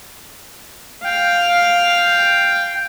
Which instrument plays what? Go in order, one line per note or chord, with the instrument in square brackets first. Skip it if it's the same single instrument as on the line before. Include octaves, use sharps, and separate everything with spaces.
[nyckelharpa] F5 [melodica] G5